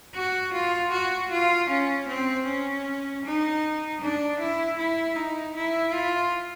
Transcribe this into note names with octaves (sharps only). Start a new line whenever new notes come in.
F#4
F4
F#4
F4
C#4
C4
C#4
D#4
D4
E4
E4
D#4
E4
F4